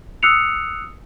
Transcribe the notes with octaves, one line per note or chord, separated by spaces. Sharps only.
D#6 E6 F#6 C7 C#7 F7